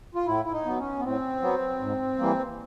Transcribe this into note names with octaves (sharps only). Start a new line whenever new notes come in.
F4
A2 E4
E4
D#4
F#3 B3
C#4
B3
A2 C4
F#3 B3
G#2
E3 G3 A#3